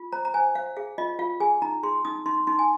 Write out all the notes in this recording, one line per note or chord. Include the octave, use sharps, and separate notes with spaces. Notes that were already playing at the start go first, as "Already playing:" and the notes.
Already playing: F4
C5 A#5
A#5
C5 G#5
C5 F5
G#4 F5
F4 D#5
F4 F5
G#4 G#5
D#4 A#5
G#4 C6
D#4 D#6
D#4 C6
D#4 C6
G#5